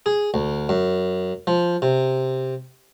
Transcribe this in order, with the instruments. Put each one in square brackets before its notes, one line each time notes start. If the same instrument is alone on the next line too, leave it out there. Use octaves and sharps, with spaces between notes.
[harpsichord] G#4
D2
F#2
F3
C3